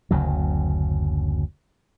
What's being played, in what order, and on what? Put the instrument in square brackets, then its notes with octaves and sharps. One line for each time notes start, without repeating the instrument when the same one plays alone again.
[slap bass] F#1 D2 C#3 F#3